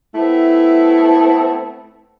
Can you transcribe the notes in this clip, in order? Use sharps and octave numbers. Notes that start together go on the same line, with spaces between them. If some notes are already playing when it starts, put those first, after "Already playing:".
A3 B3 C4 E4